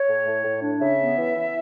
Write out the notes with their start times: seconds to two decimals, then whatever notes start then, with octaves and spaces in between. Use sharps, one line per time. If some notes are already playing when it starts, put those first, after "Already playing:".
Already playing: C#5
0.08 A2
0.26 A2
0.44 A2
0.62 D4
0.80 C#3 E5
0.99 B3
1.18 E3
1.35 E3